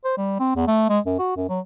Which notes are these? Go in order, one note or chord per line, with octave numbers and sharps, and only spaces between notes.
C5
G3
C4
E2
A3
G#3
F#2
F#4
F#2
F#3